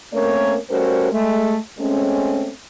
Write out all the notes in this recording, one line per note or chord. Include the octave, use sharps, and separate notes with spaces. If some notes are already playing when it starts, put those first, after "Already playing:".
A3 A#3 C4 C#4 A#4 C#5
G3 A3 C#4 F#4 A#4 C5
G#3 A3
G#3 A3 C4 C#4